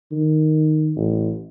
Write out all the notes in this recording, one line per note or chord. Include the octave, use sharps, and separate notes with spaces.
D#3
A1